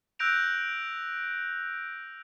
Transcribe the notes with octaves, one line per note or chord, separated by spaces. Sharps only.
E6 F#6 G6 A#6 D7 F7